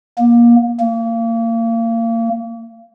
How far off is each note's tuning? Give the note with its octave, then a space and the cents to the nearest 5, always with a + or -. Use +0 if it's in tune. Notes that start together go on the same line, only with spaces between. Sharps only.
A#3 +25
A#3 -30